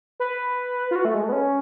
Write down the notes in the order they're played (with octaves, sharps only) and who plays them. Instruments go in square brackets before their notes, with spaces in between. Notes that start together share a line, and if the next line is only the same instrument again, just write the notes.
[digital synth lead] B4
F4
F#4
A3
G#3
A3
B3
C#4